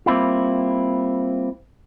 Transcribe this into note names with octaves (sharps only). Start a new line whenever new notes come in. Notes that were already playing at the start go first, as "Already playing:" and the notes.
G3 A#3 C4 E4 F4